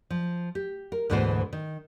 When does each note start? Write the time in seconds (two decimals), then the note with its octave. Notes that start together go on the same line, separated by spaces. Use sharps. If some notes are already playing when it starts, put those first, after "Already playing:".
0.10 F3
0.55 G4
0.92 A#4
1.10 D2 G#2 B2 E3 B3 C5
1.53 D#3